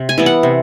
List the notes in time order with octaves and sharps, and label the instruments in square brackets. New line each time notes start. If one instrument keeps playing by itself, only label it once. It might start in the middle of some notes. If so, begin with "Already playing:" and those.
Already playing: [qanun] C3
G#5
E3 G3 B3
F#5
C3